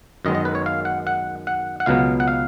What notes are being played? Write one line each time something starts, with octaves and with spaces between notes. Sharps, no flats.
F#2 D#3 G#3 B3 D#5
D#5
B4
C#5
F5
F#5
F#5
F#5
F#5
C#2 B2 F#3 B3 F5
F#5
F5